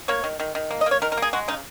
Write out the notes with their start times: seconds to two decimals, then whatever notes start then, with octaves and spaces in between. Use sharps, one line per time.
0.08 A#3 C#5
0.24 D#3
0.40 D#3
0.55 D#3
0.71 A#3
0.81 D#5
0.86 A#3
0.91 C#5
1.02 D#3 A#4
1.12 A#4
1.17 A#3 G#4
1.33 G#3 F#4
1.48 C#3 D#4